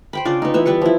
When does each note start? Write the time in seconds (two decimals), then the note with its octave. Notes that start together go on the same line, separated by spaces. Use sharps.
0.13 C5 G5 B5
0.25 C#3 D4 F4 D5
0.42 B3 D#4
0.54 E3 B3 E5
0.66 G3 B3 B4 C#6
0.82 F3 E4